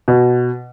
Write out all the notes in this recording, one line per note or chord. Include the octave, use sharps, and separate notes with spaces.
B2